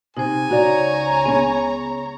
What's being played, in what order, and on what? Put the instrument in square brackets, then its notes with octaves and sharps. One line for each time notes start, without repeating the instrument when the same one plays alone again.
[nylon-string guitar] C3 [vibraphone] D#4 C5 [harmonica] G#5
[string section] C#2 C#5 A#5 [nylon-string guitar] F#4 D5
[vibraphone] B3 [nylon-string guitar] C#4 G#4